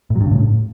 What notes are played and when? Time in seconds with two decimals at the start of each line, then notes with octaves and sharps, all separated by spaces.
0.10 A2
0.16 F#3
0.21 G2
0.26 C#3
0.31 A2